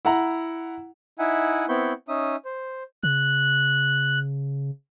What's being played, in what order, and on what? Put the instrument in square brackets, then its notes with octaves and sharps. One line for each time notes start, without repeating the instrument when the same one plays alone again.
[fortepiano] E4 F#5 A#5
[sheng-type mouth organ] D#4 E4 E5 F#5 G#5
B3 C4 E4 B5 C#6 G6
C#4 D#4 E5 D#6
C5
[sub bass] C#3 [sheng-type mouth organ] F#6